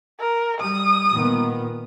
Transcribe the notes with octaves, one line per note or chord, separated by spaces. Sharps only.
A#4
G3 D#6
A#2 D#3 B3